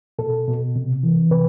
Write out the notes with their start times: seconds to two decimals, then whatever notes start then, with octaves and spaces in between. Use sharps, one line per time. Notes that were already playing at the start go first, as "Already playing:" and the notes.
0.19 B2 A4
0.48 B2
0.76 C3
1.03 E3
1.31 C3 B4